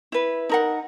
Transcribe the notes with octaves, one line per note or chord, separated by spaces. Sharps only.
E4 B4
D#4 A#4 F#5